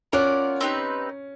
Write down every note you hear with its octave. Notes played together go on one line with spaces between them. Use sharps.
C#4 F4 A#4 D5 F#5
C4 D#4 G4 B4